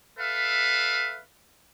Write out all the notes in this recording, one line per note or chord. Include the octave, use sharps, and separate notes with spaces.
A4 B4 E5 F5